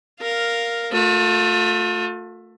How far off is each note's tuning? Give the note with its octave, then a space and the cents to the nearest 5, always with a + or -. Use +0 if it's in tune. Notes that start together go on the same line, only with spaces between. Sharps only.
A#4 +0 F5 +0
A3 +10 F4 +40